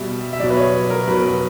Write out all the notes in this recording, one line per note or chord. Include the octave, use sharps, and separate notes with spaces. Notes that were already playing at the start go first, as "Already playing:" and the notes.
Already playing: B2 G3 E5
E5
B2 F#3 D5
B4
C#5
A#4
B2 F#3 B4